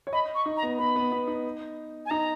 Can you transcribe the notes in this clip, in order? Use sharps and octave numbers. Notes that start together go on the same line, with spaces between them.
C#5
D#5 B5
C#6
D#4
A#5
B3
B3 B5
B3
B3
D#4
G#5
D#4 A#5